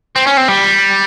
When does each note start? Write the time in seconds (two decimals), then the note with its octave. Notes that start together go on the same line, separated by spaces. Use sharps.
0.16 C4
0.26 C#4
0.37 C4
0.48 G3